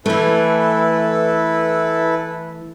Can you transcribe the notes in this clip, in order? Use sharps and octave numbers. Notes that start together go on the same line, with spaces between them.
E3 A3 E4 A4 B4